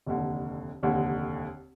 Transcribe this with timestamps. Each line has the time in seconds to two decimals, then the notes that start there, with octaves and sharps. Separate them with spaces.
0.07 F1 D#2 D3
0.83 F1 D#2 D3